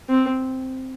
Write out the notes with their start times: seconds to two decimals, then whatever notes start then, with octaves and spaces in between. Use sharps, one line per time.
0.09 C4